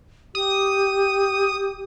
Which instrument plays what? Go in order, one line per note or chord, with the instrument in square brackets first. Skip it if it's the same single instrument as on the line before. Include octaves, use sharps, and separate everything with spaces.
[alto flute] G4 [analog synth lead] D#6